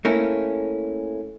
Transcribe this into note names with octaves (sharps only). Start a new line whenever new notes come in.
A3 A#3 C#4 E4